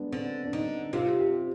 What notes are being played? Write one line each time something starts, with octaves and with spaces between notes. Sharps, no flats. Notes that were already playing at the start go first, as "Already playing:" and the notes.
Already playing: G#3 B3 D4
D3 C4
D4
D3 D#4
C3 F4
G4